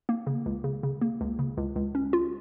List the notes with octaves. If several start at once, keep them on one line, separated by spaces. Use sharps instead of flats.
A#3
C#3
C#2
C#3
C#3
A#3
C#2
C#3
C#2
C#2
C#4
F4